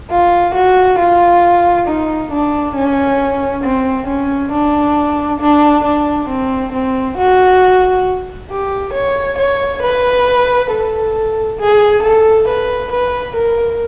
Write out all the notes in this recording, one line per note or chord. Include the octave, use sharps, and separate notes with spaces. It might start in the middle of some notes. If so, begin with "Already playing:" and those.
F4
F#4
F4
D#4
D4
C#4
C4
C#4
D4
D4
D4
C4
C4
F#4
G4
C#5
C#5
B4
A4
G#4
A4
B4
B4
A#4